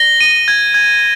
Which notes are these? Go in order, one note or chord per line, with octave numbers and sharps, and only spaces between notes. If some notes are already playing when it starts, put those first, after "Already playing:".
Already playing: A#6 G7
D#7
G#6
G#6